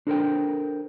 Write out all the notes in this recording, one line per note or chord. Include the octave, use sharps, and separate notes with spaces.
D4 A4 A#4 C5 G5